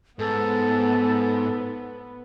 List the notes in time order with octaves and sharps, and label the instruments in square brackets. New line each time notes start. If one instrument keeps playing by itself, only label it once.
[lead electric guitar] G#2 [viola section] B3 [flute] A4